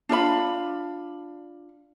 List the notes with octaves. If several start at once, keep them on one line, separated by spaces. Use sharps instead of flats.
D4 F4 D5 B5